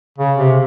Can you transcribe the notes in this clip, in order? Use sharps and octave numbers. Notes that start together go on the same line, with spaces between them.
C#3
C3